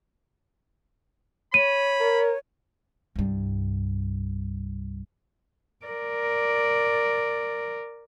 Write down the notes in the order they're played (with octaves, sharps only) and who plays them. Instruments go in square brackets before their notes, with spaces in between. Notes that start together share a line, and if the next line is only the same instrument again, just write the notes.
[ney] C#5 [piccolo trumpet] B5 [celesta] D#7
[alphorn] A#4
[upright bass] C2 G2
[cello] A#4 D5